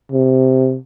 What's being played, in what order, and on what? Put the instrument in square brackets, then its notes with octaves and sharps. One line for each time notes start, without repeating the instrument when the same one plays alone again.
[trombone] C3